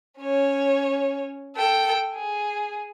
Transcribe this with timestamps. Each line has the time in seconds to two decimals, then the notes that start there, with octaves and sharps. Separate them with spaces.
0.20 C#4 C#5
1.56 A4 G5
2.15 G#4